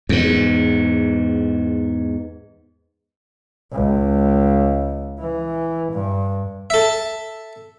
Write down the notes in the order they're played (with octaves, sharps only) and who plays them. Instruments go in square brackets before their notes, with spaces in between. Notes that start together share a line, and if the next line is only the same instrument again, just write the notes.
[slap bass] E2 G#2
[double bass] C#2
E3
G2
[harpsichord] A4 E5